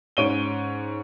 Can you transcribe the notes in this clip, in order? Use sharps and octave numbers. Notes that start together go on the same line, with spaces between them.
G#2 C#4 C#5 D7 D#7 G7